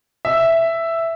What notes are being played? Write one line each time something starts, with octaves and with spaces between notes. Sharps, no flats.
E5